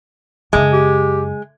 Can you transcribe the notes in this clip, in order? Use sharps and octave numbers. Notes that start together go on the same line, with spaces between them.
F#2 C#3 G#3
G4